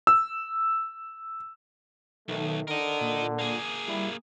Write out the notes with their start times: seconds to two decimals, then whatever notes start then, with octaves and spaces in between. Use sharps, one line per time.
0.07 E6
2.28 B1 D#3 A3
2.68 D3 A#4 D#5
3.01 A#2
3.39 A#3 G#4
3.88 G3 E4